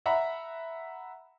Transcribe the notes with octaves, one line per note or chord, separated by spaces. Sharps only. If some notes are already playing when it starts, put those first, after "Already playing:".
E5 F#5 A#5 B5